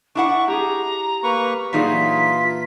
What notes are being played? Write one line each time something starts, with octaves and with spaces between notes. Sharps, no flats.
D4 E4 F#5 C#6
G4 G#4 A#5
A#3 B4 C#6
A#2 E3 F#3 D4 D#4 F4 G#4 B6